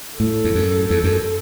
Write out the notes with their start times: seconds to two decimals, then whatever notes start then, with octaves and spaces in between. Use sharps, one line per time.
0.20 A2 A4
0.44 E2
0.55 F#2
0.90 E2
1.04 F#2